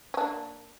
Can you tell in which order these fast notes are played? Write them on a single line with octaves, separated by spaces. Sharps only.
C#4 D4 A#3